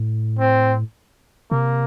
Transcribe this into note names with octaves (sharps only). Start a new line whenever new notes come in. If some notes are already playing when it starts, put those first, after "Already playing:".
Already playing: A2
C4
C3 A#3